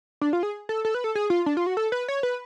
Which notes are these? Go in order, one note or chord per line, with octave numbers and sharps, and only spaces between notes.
D4
F4
G#4
A4
A4
B4
A4
G#4
F4
D4
F4
F#4
A4
B4
C#5
B4